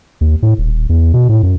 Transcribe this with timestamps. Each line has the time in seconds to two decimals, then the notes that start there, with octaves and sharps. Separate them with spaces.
0.21 D#2
0.42 A2
0.58 D#1
0.89 E2
1.14 B2
1.29 A2
1.43 F#2